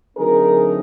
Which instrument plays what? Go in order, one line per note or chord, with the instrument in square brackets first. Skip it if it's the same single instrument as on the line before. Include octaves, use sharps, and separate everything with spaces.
[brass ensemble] D3 F#3 A3 C4 D#4 G#4 A#4